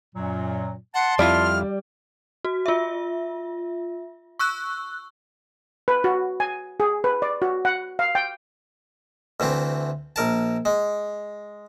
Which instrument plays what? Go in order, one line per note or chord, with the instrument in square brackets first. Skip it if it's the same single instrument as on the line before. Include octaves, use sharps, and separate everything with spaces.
[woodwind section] F#2 A#2 F#3
[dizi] F#5 [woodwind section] A5 C6
[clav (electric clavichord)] F2 E4 F4 [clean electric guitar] G3 D5 [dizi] F6
[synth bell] F#4
F4 E5
C#6 E6 F#6
[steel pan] B4
F#4
G#5
G#4
B4
D5
F#4
F#5
F5
G5
[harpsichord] D2 E3 A3 C4
A#1 A#4 A5
G#3